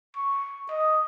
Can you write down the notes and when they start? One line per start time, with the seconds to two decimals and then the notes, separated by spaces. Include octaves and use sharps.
0.16 C#6
0.70 D#5